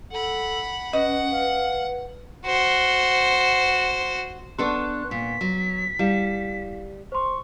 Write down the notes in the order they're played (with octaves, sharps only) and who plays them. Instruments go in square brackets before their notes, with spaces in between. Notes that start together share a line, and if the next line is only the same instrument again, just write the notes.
[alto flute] A4 [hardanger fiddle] F#5 B5
[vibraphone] C#4 [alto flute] B4 [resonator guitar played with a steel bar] D#5 [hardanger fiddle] F#5
[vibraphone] B4 [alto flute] F5
[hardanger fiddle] F#4 C5
[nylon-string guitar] B3 D4 A4 [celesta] C6 C#6 [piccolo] F#6
[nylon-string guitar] A#2 [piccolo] B6
[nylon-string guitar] F#3
[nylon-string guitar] G3 [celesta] E4 F5 E7
[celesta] C5 C6 [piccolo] C#6